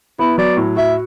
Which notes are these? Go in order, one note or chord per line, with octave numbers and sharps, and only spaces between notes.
B3 E4
F#3 D5
A2
F#4 E5